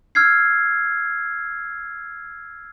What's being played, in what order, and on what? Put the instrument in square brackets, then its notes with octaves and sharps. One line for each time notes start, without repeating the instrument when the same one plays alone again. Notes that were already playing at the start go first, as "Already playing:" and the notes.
[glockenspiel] E6 F6 G#6 C7